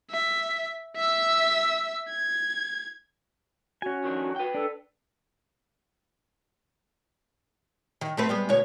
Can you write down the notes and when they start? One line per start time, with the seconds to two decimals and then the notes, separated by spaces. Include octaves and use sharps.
0.11 E5
0.96 E5 E6
2.09 G#6
3.82 C#4 F#4 G#5
4.04 D#3 F3 D4
4.36 B4 G5
4.54 D4 A4
8.01 D#3
8.17 A3 C4 B4
8.29 G3 G#3 B3
8.49 D2 B2 C#5